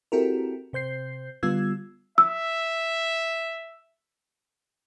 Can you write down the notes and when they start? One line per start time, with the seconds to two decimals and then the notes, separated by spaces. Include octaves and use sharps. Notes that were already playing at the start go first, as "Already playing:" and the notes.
0.12 C4 E4 F#4 G4 A4 A#4
0.73 C3 C5 G6 C7
1.43 D3 G3 B3 F4 E6 G#6
2.18 E5 E6